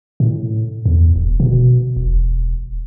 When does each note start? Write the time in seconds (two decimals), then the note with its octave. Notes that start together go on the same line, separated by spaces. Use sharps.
0.20 A2
0.86 E2
1.16 E1
1.40 B2
1.97 E1